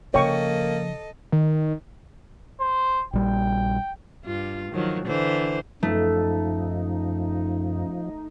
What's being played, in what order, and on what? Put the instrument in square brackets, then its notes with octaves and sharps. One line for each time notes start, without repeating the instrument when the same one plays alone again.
[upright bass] C#3 F3 [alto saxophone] A#3 [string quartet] A4 D#5 [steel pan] C#5 G5 C#6
[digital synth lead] D#3
[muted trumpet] C5
[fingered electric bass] A#1 G3 [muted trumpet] G5
[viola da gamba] G2 F4
D#3 F3 F#3
D3 E3 C5
[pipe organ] F#2 [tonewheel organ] F3 [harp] A3 [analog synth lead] D#4